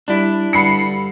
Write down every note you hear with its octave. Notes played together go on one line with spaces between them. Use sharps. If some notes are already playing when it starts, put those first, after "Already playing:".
G3 D4 E4
G2 D3 B5 C7 C#7